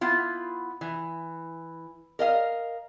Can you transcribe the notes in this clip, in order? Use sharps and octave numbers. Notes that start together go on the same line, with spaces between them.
B3 E4 F4
E3
A#4 D#5 F5